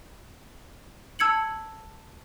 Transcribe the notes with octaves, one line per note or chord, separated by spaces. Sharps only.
A5 E6 G#6 C#7 F#7